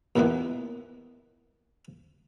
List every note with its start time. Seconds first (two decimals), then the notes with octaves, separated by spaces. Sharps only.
0.16 D#2 A#2 D#3 E3 A#3 B3